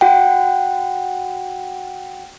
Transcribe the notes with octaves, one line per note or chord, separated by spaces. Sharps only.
F#4 F#5 G5